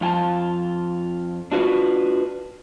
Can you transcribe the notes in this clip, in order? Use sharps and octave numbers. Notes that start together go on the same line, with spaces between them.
F2 F4 G#5 A5
D4 F4 F#4 A#4 B4